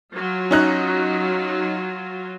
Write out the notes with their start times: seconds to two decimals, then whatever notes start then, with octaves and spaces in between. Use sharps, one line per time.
0.14 F#3 F4
0.51 C#4 D#4 F#6